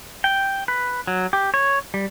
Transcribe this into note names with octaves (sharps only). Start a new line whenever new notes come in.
G5
B4
F#3
G4
C#5
G3